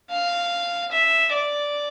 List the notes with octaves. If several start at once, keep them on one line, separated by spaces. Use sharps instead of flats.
F5
E5
D5